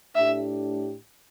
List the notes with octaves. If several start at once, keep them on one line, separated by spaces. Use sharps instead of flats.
A2 A3 D4 G4 E5